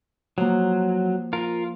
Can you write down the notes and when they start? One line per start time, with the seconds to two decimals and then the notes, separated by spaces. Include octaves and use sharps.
0.38 F3 F#3 A#3
1.33 F4 A#4